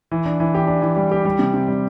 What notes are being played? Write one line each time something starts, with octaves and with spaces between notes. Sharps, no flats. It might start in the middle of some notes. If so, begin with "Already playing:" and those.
E3
D4
E3
G4
D4
E3
G3
G4
G3
C3
C3
G3